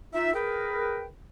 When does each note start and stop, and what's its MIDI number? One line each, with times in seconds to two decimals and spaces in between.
0.13 0.34 63
0.13 0.34 65
0.13 0.34 76
0.35 1.06 68
0.35 1.06 70
0.35 1.06 71
0.35 1.06 79